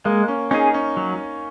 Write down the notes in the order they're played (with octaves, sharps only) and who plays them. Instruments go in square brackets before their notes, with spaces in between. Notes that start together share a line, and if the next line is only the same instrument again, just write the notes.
[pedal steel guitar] G#3 [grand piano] A#3
[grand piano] C#4
[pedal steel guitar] C#4 G#4 [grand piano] D#4
[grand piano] C#4
[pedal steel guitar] F#3